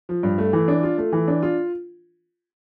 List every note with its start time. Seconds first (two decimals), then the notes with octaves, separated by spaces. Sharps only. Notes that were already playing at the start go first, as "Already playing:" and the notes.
0.09 F3
0.23 G2
0.38 A3
0.53 E3
0.68 D4
0.83 F4
0.98 A3
1.12 E3
1.28 D4
1.43 F4